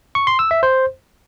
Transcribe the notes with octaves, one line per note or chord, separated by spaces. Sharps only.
C#6
C6
E6
E5
C5